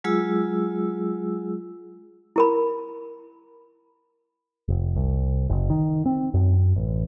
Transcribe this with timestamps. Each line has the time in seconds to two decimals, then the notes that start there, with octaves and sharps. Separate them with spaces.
0.04 F#3 G#3 F4 G#4 E6
2.36 E4 A#4 B5
4.68 F1
4.96 C2
5.50 F#1
5.70 D#3
6.06 C4
6.34 F#2
6.76 A1